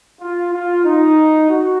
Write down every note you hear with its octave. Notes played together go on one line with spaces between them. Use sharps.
F4
F4
D#4
F#4